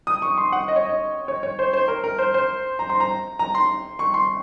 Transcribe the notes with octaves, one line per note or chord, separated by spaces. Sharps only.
D#6
C#6
C6
F#5
D#5
C#5
D#5
C#5
C#5
C5
C5
A#4
A#4
C5
C5
A#5
C6
A#5
A#5
C6
C#6
C6